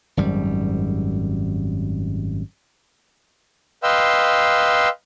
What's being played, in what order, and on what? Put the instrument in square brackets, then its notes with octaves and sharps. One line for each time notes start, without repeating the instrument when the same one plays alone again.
[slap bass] G#1 F#2 G3
[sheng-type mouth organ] B4 D#5 F5 G5 C6 E6